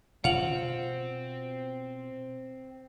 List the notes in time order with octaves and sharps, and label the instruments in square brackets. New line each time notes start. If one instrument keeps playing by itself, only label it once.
[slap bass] B2 C#4 [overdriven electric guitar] C4 [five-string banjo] F4 [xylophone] F#5 F7 F#7